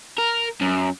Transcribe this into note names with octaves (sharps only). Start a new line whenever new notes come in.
A#4
F#2